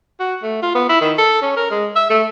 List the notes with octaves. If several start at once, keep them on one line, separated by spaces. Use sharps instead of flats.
F#4
A3
F4
B3
E4
D#3
A4
C#4
A#4
G#3
E5
A3